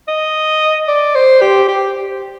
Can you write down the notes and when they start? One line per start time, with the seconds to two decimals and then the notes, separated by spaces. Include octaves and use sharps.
0.08 D#5
0.88 D5
1.15 C5
1.42 G4
1.68 G4